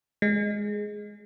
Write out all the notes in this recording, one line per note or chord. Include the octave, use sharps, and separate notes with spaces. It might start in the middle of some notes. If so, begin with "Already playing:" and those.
G#3